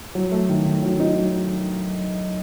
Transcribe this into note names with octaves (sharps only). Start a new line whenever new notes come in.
F#3
A3
D#3
D#3
F#3
D#4
F#3